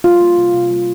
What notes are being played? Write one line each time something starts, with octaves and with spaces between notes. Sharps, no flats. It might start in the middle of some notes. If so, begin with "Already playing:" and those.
G3 F4
A#3
C3
C3
G3